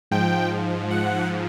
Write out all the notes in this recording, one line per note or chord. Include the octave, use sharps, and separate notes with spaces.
G#2 F3 G5
F#5